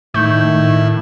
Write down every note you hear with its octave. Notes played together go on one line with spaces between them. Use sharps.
A2 D#3 E4 C#6 G6
A2